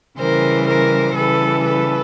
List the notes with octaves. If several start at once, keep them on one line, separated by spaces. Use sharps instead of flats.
C#3 E3 G3 A#4 C5
A#4 C5
C#3 E3 G3 A4 B4
A4 B4